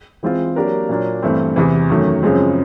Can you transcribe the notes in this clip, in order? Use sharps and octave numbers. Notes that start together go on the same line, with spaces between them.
E3 G#3 C4 F4
F#3 A#3 D4 G4 A#4
A#2 F#3 A#3 D4
G2 E3 A3 C4
E2 C3 E3
F#2 D#3 F#3 A3
F#2 C#3 F3 G#3 C4